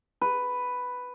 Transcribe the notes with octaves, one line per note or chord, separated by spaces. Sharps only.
B4